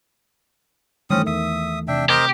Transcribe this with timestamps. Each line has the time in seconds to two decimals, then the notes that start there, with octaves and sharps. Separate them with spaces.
1.10 G1 D#3 E3 G3 A3 C4 C#4 D#6
1.27 E2 E5 D#6
1.88 C3 D4 E5 G5
2.09 G4 A#4 C5 D#5